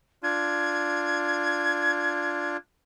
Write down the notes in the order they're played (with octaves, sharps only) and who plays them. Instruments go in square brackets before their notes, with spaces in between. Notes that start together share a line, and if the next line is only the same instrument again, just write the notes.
[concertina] D4 F4 [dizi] G#6